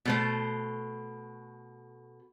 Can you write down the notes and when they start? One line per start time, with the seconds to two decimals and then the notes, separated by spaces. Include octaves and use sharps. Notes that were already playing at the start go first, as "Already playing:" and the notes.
0.05 B2 A3 C5